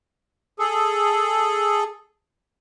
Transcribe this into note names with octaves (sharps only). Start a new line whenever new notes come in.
G#4 A4